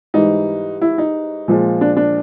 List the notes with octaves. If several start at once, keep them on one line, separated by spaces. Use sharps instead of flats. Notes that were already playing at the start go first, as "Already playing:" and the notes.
G#2 E3 G3 D#4
E4
D#4
A#2 F3 G#3
D4
D4